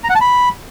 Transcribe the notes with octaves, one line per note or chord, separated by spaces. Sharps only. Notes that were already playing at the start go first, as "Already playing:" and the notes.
A#5
F#5
A5
B5